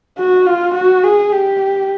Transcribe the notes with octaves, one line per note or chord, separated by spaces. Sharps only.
F#4
F4
F#4
G#4
G4